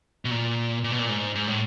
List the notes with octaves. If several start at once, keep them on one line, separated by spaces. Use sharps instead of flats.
B2
A#2
A#2
B2
A#2
G#2
G#2
A2